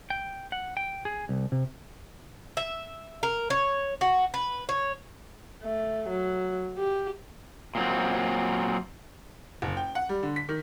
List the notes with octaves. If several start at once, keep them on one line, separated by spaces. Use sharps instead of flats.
G5
F#5
G5
G#4
C2
C3
E5
A#4
C#5
F#4
B4
C#5
A3
F#3
G4
A#2 F#3 C4
F#1
G5
F#5
G3
D3
B6
D#3